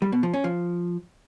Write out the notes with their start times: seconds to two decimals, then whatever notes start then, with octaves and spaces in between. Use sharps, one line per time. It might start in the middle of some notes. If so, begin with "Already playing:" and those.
0.02 G3
0.12 B2
0.23 F3
0.33 C#4
0.44 F3